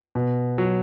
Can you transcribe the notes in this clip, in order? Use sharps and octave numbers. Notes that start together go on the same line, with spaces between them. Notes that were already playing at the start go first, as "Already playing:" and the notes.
B2
F#3